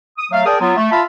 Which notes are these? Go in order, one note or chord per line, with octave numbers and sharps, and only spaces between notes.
D#6
F#3 A3 F5
G#4 A#4 D5 G5 A5 D#6
F#3 B3 F4
A3
F4 E5 F5 A5 B5